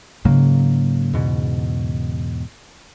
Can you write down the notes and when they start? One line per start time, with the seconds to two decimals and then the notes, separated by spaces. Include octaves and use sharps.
0.25 G#2 C#3 F#3 A#3
1.13 E2 G#2 B2